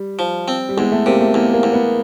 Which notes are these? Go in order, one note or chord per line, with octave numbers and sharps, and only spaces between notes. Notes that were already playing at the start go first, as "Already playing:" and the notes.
Already playing: G3
F3
C4
G3
E2 G#3
A3
C3 A#3
A3
E2 A#3
A#3
E2
B3